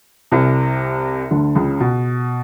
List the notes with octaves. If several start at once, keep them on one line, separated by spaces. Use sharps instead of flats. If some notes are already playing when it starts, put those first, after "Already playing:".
C2 C3
D2 D3
C#2 C#3
B2